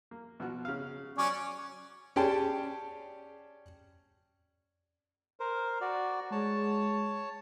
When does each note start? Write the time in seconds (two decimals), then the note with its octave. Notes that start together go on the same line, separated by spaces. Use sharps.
0.11 A#3
0.40 B2 F3 F#4
0.65 C#3 F5
1.18 F#3 C#4 C#5 D5
2.16 C#4 G4 G#4 D5 G5 A5
5.40 A#4 C5
5.81 F#4 D5
6.32 G#3 C#5 A5